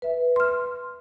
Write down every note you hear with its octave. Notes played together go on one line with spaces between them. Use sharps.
B4 E5
C6 F6